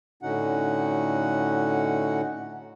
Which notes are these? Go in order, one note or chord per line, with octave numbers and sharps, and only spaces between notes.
A2 D3 C#4 D#4 F#4 F#5